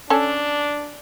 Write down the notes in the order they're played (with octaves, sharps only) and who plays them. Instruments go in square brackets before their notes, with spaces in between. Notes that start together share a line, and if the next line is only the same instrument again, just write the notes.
[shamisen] C#4 A4 [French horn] D4